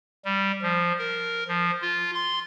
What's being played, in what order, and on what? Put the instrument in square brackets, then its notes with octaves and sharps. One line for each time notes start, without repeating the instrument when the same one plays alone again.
[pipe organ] G3
F3
A#4
F3
F4
C6